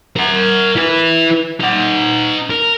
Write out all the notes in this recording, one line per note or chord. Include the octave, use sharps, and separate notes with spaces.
A#4 F#5
E4 B4
D#4 F#5
A#4